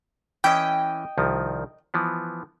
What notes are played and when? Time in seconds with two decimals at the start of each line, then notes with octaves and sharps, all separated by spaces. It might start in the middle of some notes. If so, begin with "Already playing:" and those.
0.44 E3 C#4 E4 D#5 G5
1.18 C2 D#3 F3
1.94 E3 F3 B3